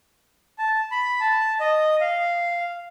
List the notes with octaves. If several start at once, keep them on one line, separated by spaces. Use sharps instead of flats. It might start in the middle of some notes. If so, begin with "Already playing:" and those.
A5
B5
A5
D#5
F5